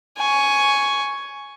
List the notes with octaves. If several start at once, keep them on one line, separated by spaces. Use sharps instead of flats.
G#5 C#6